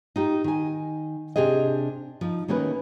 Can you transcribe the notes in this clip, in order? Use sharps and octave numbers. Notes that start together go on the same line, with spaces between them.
D#4 F4 G4
D#3 G#5
C3 D4 G4 G#4 D#5
F3 D#4
D#3 A3 A#3 C#4 A#4 B4